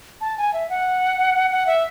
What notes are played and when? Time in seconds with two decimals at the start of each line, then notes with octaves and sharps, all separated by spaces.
0.21 A5
0.38 G#5
0.54 E5
0.70 F#5
1.51 F#5
1.67 E5